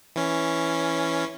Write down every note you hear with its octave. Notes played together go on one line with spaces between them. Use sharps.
E3 C#4